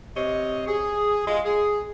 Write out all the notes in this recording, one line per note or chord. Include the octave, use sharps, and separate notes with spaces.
C3 C#5 D#5
G#4
G#3 F4
G#4